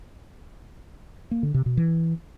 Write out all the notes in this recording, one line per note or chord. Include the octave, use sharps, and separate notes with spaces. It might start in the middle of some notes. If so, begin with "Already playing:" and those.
A#3
D3
C3
B2
E3